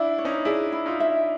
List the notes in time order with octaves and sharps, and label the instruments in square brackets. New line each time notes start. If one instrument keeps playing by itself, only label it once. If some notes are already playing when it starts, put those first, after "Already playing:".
Already playing: [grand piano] D4 E4 [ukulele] E5
[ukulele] C#5
[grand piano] C#4 D#4
[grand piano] D4 E4 [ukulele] G#4
[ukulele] E4
[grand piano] D#4 F4
[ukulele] E5